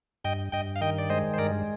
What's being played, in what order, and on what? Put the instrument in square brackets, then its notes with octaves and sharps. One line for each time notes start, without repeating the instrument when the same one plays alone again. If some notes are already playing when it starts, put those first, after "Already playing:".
[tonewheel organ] G2 D#5 G5
G2 D#5 G5
F5
D#3 D#5 G5
D5
G#3 C5 D#5
C5
G2 A#4 D5